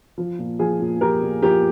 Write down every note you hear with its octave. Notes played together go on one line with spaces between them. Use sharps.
F3
A#2
F3 G#4
A#2
F3 G4 A#4
A#2
F3 G4 A#4